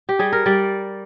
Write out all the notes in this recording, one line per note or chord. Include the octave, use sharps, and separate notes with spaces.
G4
G3 G#4
A#4
G3 D5